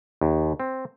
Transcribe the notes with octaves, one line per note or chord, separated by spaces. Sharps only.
D#2
C4